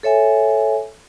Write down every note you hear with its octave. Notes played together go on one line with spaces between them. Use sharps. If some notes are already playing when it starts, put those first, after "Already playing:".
A4 C#5 E5 G#5